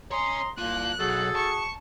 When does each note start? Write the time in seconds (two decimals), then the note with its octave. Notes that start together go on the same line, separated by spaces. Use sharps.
0.12 C#5 D#5 G#5 A#5 C6
0.58 C2 F3 A#3 F4 F#6
0.99 B1 F#4 G#4 A4
1.35 A5 C#6